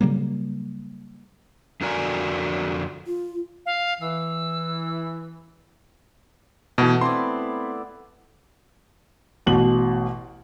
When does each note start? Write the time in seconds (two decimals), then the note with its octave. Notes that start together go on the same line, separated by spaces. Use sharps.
0.01 C#3 F#3 G3 A#3
1.81 F2 D3 F#4 A#4 D5 G#5
3.07 F4
3.66 F5
4.01 E3 E6
6.78 B2 E3 A3 B3
7.01 C4 E4 D5 C6
9.46 A1 B2 F#7